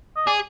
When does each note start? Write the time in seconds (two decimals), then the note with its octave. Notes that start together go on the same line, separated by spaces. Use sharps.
0.16 D#5
0.27 G#4 D5